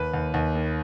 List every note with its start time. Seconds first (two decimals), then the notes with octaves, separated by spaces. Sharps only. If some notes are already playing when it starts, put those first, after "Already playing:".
Already playing: D#2 B4
0.14 D#2
0.34 D#2
0.55 D#3